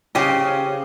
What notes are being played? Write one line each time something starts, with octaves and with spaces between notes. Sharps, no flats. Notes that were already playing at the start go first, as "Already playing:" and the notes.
C#3 G4 C5 D#5